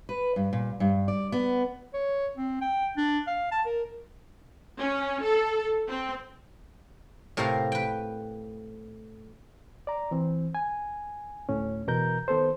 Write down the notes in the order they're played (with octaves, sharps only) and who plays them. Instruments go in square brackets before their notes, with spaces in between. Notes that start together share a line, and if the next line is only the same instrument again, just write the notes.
[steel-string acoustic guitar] B4
G2
A#2
G2
D5
B3
[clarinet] C#5
C4
G5
D4
F5
A5
A#4
[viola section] C#4
A4
C4
[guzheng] A2 C3 G4 A#4 C5 F5
B4 G5
[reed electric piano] D5 A#5
E3 C4
G#5
D2 A2 C#4
E2 B2 A#4 A#5 G6
D#3 B3 A4 C5